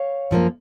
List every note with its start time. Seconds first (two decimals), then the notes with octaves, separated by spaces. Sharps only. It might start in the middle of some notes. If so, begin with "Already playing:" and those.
Already playing: C#5 F5
0.31 F#2 F3 A#3